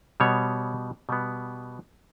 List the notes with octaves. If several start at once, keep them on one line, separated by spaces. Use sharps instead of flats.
B2 G3 B3 C#5
B2 G3 B3